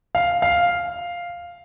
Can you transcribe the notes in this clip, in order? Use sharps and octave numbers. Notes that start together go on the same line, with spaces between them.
F5
F5